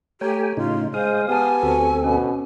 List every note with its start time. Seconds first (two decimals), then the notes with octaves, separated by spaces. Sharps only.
0.21 A3 G4 C#5 G5 G#5 A#5
0.57 A2 C#3 D#4 F4
0.94 G#3 C5 F5 D#6 F6
1.28 B3 G4 G#5 A5
1.62 D2 C4 F#4 A4
2.04 B2 C#4